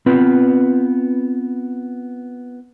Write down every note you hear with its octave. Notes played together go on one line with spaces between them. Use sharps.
B3 C4 F4 B4